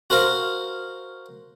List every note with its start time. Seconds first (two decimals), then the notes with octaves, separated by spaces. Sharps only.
0.10 F#4 A#4 C5 F5